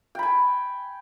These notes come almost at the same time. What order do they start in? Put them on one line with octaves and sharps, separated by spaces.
G5 B5 G#5